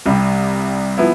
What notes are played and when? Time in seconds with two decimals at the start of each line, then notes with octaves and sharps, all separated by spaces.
0.05 C2 C3 G3
0.97 F3 B3 E4